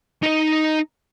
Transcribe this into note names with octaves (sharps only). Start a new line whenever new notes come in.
D#4 D#5